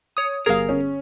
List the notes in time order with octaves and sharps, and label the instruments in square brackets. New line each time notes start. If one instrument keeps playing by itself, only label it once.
[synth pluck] C#5 D#6
[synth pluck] G1 G#4 [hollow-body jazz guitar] A#4 F5
[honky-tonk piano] C#4